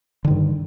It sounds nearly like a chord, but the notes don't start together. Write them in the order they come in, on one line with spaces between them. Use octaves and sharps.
D3 D#3 G2